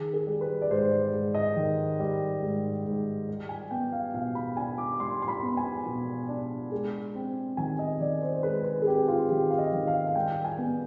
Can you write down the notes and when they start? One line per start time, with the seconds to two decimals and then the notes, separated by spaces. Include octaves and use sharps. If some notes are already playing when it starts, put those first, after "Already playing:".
Already playing: D#3 G#4
0.14 G#4
0.27 G3
0.41 B4
0.62 D5
0.70 G#2 C5
0.91 D5
1.13 G#2
1.35 D#5
1.56 D#3
1.99 G3
2.42 G#2
2.85 G#2
3.28 G3
3.49 G#5
3.71 B3 G5
3.92 F5
4.14 B2 F5
4.35 B5
4.57 D4 G#5
4.78 D6
5.00 G3 C6
5.22 C6
5.28 B5
5.43 B3
5.57 G#5
5.86 B2
6.29 D4
6.72 G#3
7.15 C4
7.57 D#3 G#5
7.79 D#5
8.00 D#3 D5
8.22 C5
8.43 G#3 B4
8.64 B4
8.82 G#4
8.87 C4 G4
9.08 F4
9.30 D#3 G4
9.50 F5
9.58 D#5
9.73 D#3
9.87 F5
10.07 F5
10.15 G3 G5
10.45 G#5
10.58 B3